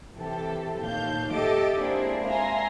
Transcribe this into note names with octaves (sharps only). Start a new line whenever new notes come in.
C3 E3 G4 A4
D#2 A#2 F5 A5 G6
G4 A4 D#5 E5 A5 D6
G#3 A#3 C4 D4 E4 G#4
E5 F5 G#5 A#5 C6